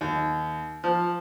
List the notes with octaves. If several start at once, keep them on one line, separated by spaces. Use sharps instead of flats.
D#2
F3